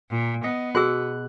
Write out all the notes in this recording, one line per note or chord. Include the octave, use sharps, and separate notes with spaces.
A#2
B3 D#5
B2 F#4 G#4 E6 F#6